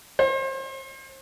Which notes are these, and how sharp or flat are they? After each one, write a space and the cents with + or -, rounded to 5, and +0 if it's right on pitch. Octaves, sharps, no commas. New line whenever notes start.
C5 +35